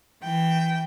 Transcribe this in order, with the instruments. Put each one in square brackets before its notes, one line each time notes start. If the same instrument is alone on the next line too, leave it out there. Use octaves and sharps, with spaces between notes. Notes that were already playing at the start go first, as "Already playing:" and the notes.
[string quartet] E3 G5